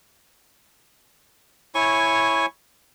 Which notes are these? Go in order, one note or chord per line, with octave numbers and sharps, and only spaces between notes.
E4 C#5 G#5 C#6